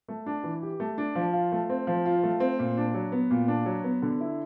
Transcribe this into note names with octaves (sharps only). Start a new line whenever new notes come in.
A3
D4
E3
G4
A3
D4
F3
F4
A3
C4
F3
F4
A3
C4
A#2
D4
F#3
B3
A#2
D4
F#3
B3
D3
E4